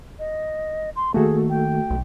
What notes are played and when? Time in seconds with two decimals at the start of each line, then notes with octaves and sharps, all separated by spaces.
0.19 D#5
0.96 C6
1.14 D#3 A3 A#3 F#4 G#4 A4
1.50 G5
1.90 B1